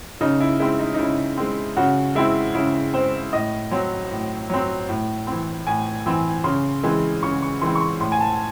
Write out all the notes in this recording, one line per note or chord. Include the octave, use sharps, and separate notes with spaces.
C#3 D#4
E4
G#3 C4 E4
D#4
D#4
C#3 E4
G#3 C4
C#3 F#4
G#3 C4 E4
C#3 E4
G#3 C4 C5
A2 D#5
F#3 C4
A2
F#3 C4
A2
E3 C4
A2 G#5
E3 C4
C#3 C6
E3 G#3 C4
C#3 C#6
C#6
E3 G#3 C4 C6
C#6
C6
A2 C6
G#5
A5